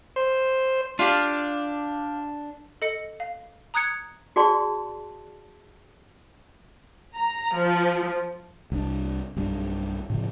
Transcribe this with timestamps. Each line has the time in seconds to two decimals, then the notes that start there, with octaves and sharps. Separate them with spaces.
0.16 C5
0.99 D4 F4 G4 F5
2.82 A4 D#5 C#7
3.20 F5
3.74 A#5 D#6 F#6 G#6 C#7
4.36 F#4 G#4 D5 A5 C6
7.18 A#5
7.55 F3
8.72 C2 D4
9.37 B1 G2 C#4 D4
10.10 A2 C#3 F3